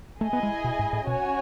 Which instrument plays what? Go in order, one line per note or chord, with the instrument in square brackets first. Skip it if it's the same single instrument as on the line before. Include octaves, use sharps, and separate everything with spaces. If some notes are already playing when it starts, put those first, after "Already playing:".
[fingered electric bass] A3 [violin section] E4 G#4 D#5 G#5
[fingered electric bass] B3
G#3
B2
G#2
A2
[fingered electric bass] B2 [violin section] C#4 F#4 C#5 G#5